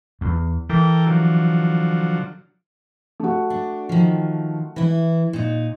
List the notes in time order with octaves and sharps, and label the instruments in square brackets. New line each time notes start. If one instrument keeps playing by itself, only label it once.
[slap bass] E2
[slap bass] E3 [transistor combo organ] A4 A#4 G5
[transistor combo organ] D3 F3 F#3
[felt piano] A3 F#4
[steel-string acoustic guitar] D4
D#3 F3
E3 E4
A#2 D#4